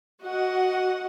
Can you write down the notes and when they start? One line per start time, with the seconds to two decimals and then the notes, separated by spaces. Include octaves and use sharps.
0.21 F#4 D#5 F#5